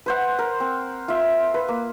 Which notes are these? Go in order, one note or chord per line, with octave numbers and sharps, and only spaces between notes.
B4 C5 F#5
A#4
C4
F4 E5
B4
A#3